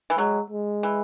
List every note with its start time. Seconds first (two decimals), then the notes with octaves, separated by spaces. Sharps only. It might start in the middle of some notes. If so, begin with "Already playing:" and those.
0.10 E3
0.18 F#3 G#3
0.50 G#3
0.83 E3